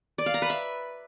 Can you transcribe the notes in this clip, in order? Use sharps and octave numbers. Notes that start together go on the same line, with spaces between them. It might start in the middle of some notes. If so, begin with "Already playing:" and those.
D5
F5
A#5
B4
E5